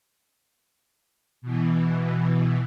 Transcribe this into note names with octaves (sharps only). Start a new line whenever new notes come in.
B2 E3